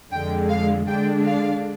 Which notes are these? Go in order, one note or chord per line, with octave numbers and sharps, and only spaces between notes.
F2 D3 G#3 G5
F5
D3 G#3 D4 G5
F5